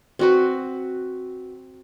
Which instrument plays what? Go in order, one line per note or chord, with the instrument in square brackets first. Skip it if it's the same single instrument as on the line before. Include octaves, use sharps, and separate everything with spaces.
[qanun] C4 F#4 B4